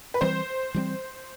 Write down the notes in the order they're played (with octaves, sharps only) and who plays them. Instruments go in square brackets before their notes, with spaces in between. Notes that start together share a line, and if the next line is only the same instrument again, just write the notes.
[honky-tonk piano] B4
[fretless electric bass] E3 G3 C4 [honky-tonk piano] C5
[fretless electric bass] E3 G3 C4